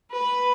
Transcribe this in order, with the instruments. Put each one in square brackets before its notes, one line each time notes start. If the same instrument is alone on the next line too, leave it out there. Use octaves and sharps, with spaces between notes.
[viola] B4